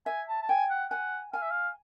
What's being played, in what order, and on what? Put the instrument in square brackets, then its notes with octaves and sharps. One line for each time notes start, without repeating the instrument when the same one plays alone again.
[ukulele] E5 [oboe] G#5
[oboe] A5
A5
[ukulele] G5 [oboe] G#5
[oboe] F#5
[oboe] F#5 [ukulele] G#5
[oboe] F5 [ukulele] G#5
[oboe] E5
F5